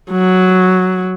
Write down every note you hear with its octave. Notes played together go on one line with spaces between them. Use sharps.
F#3